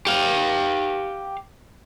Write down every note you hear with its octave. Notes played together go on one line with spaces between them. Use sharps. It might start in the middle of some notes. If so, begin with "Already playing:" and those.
G4 F5